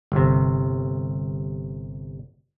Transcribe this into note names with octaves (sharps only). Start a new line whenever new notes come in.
G1 C3